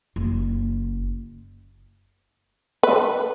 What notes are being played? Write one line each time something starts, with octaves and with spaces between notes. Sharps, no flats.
F#1
B4